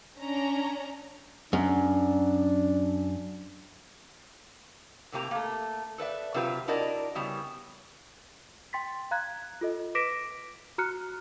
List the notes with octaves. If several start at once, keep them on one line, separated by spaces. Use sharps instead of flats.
C#4 D4 A#5
F#2 D4
A2 C3 A#3 G4 A#5
A3 A#3
A4 B4 D5 E5
C3 F#3 F4 G4 B4
D4 E4 F#4 A#4 D5 D#5
C#3 G3 B3 E4
G5 C6 A6 B6
F5 A#5 F#6 G#6
F4 A4 D#5
B4 D6 A#6 B6 D7 E7
F#4 A#5 F6 F#6 C#7